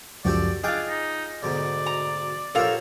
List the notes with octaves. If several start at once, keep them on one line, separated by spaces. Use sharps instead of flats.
C#2 F#2 F3 F#4 G4 A4 D5
D4 F4 G#4 D#5 F5 G5 D6
D#4
D2 G#2 B2 D5
A#5
A#1 G4 A4 A#4 C#5 F5